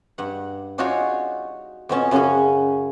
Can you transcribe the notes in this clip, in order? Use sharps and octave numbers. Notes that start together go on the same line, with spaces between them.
G2 F#5
D4 D#4 F4 F#4 G#4 C#5
F2 B2 C#4 A5
F#2 C#3 C#4 F#4 G#4